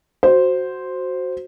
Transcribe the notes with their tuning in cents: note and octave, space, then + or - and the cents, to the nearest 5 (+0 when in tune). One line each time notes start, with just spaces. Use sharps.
F#4 +0 C5 +0